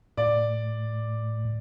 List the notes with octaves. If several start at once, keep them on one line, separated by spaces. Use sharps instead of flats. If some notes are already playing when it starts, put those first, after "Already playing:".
A2 D5